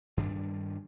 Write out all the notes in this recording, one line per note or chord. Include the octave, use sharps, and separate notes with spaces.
G2 D#3 G3 D4